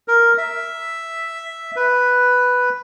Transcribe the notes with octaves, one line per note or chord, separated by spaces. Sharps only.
A#4
E5
B4